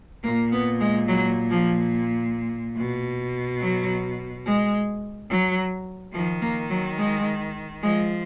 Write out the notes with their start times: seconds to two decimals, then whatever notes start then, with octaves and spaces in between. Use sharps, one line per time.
0.24 A#2 A#3
0.52 B3
0.80 G#3
1.08 F#3
1.51 F3
2.77 B2
3.61 F#3
4.45 G#3
5.30 F#3
6.14 D#3 F3
6.41 A#3
6.70 F#3
6.98 G#3
7.82 F3 G#3